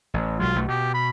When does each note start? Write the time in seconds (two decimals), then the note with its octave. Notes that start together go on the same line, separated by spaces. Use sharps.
0.14 A1
0.39 B1 F#3 G#3 F4
0.55 B1 A3
0.68 B2 G4
0.94 B5